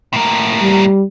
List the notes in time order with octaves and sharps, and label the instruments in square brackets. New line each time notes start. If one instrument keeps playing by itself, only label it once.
[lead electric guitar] A2 A#3
[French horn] G3